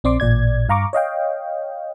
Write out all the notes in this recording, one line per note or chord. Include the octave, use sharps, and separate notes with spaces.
A#1 C4 D5 C6 D6
A1 A#2 D5 G#6
G2 F5 A#5 C#6 D6
C#5 D#5 F5 G5